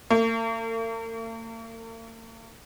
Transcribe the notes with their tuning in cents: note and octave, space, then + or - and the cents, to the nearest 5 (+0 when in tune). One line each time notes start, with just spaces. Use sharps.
A#3 -45